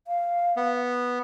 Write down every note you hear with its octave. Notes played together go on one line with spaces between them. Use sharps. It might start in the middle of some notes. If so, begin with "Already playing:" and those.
F5
B3